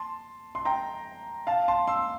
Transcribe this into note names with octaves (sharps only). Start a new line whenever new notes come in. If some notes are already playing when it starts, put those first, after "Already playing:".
Already playing: A5 C6
C6
G5 A#5
F5 A5
A5 C6
C6 E6